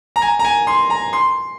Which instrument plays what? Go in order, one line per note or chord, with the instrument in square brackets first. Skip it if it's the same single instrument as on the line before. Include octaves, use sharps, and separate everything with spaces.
[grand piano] A#5
G#5
A#5
G#5
C6
A#5
C6